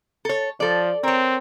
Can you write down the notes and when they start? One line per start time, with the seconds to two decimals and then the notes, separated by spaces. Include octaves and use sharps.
0.25 A4 C#5
0.60 F3 A4 D5
1.03 C4 A#4 C#5